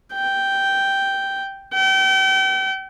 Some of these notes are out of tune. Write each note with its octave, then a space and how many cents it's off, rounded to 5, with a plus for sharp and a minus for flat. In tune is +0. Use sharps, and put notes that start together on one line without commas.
G5 -5
G5 -35